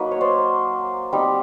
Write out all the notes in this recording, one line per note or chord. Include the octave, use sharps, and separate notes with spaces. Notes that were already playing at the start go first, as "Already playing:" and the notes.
Already playing: F#3 A#3 D#4 B4
C#5
C5 D5
G3 C4 D#4